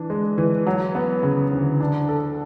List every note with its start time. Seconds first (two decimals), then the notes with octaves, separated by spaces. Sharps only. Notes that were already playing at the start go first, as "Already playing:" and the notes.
Already playing: E3 D4
0.10 G#3
0.38 E3
0.67 F#3
0.95 B3
1.23 C#3
1.51 D2
1.81 D4
2.09 A4